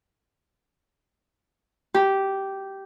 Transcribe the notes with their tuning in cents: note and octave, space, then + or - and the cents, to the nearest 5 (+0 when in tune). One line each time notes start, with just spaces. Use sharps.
G4 -10